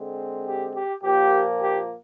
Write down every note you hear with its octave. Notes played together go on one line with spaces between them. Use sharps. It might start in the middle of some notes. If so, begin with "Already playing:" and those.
Already playing: D3 G#3 C4
G4
G4
A#2 F3 A#3 G4
G4